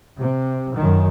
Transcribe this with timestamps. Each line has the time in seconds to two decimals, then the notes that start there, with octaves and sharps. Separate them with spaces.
0.20 C3
0.76 F#2 D#3